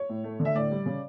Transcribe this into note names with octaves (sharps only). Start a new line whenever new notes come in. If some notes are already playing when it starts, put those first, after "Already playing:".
Already playing: C#5
A2
A3
D3
E5
A2 D5
G3
C#3